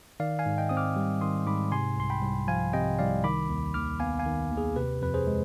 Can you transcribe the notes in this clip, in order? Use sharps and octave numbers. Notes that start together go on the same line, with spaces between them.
D#3 D5 F5
F5 G#5
G#2
D#5 G5
C4 D#6
D6 F6
G3
D#3 C6 D#6
G#2 B5 D6
C3 G#5 C6
C2 C6
G5 B5
C2
F3 F5 G#5
C3 D#5 G5
C2 D5 F5
D#3 B5 D6
D#2
D#2 D6 F6
B3 F5 G#5
F5 G#5
D#3
D#2
G#4
C3 G4 B4
F2 B4
G#4 C5
G#3